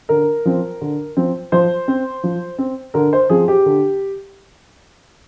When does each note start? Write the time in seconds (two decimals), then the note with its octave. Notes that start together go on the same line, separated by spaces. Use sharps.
0.09 D3 A#4
0.45 F3 C4
0.81 D3
1.17 F3 C4
1.52 F3 C5
1.88 C4
2.24 F3
2.58 C4
2.94 D3 A#4
3.13 C5
3.30 F3 C4 G#4
3.48 G4
3.66 D3